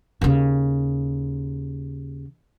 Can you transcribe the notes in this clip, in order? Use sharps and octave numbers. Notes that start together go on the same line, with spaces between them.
D#2 C#3